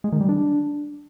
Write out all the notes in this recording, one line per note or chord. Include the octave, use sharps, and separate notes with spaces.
G#3
D#3
G3
D4